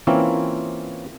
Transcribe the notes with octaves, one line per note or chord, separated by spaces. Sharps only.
E3 A#3 C4 C#4 E4 F4